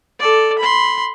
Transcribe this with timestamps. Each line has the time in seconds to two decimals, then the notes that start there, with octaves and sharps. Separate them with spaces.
0.19 A4 D5
0.59 B5 C6